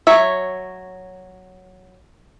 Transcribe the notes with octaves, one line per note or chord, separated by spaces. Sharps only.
F#3 C#5 E5